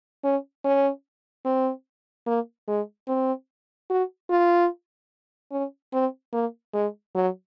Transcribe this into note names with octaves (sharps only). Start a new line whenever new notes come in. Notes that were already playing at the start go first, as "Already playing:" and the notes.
C#4
C#4
C4
A#3
G#3
C4
F#4
F4
C#4
C4
A#3
G#3
F#3